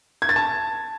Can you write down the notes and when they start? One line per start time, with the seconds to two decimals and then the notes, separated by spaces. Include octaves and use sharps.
0.22 G#6
0.29 A6
0.36 A5